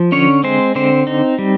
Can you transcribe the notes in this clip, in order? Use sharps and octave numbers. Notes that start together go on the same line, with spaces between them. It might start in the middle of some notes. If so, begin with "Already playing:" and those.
Already playing: F3
D3 C#4 C#5
G#3 C4 C5
D3 C4 C5
D#4
G3